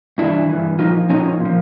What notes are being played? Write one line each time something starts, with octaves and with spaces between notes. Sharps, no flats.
G2 E3 D4 E4
G2 E3
A#2 F3 D#4 F4
A#2 F3 C#4 D#4
A#2
F3